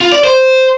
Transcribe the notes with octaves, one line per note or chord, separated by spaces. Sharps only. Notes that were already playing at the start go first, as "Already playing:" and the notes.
F4
D5
C5